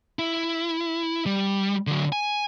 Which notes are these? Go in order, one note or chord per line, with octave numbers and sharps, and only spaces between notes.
E4
G3
D3 F#3
G#5